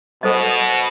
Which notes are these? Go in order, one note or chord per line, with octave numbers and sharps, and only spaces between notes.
B2 A4 C5 D#5